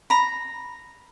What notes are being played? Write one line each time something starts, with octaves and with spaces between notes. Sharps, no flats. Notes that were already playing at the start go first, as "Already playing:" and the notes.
A#5 B5